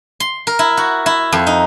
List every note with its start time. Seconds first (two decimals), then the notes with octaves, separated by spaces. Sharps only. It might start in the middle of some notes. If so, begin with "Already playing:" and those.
0.20 C6
0.47 A#4
0.59 E4
0.77 F#4
1.06 E4
1.32 F2
1.47 D#4